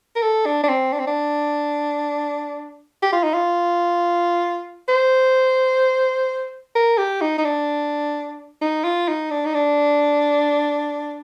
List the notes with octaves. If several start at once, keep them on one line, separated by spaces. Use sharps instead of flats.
A#4
A4
D4
D4
C4
D4
C4
D4
G4
F4
D#4
F4
C5
A#4
G4
D#4
D#4
D4
D#4
F4
D#4
D4
D#4
D4